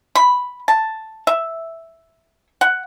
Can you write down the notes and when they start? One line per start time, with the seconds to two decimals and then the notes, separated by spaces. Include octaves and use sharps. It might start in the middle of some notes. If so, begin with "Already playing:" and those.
0.15 B5
0.68 A5
1.27 E5
2.61 F#5